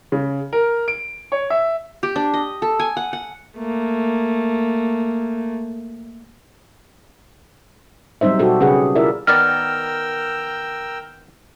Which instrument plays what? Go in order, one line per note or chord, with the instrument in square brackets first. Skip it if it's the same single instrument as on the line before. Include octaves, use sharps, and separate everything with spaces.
[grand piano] C#3
A#4
D7
C#5
E5
[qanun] G4
D4
D#5
A4
G#5
F#5
F#5
[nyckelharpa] A3 A#3
[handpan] F#3 G3 C4 D#4 C5 E5
B2 F#4 G4 A4
C#3 C#4 G4 G#4 B4 F#5
E4 F4 G#4 A#4 D5 E5
[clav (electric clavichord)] D#3 B3 D5 [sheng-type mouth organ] A#4 G5 E6 [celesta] F6